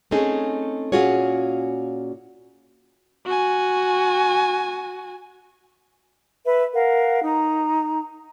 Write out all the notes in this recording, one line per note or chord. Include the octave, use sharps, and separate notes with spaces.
A3 C4 C#4 D#4 G#4
A#2 C#4 F4 F#4 G#4 C#5
F#4 G#5
B4 E5
A#4 F5 F#5
D#4 A#5